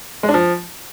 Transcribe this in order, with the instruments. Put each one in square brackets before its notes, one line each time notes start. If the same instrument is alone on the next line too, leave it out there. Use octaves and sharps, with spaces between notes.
[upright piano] G#3
D4
F3